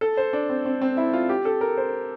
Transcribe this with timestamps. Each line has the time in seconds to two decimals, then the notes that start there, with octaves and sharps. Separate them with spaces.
0.01 A4
0.17 C5
0.33 D4
0.50 C4
0.65 C4
0.81 C4
0.97 E4
1.13 F4
1.29 G4
1.45 A4
1.61 A#4
1.77 C5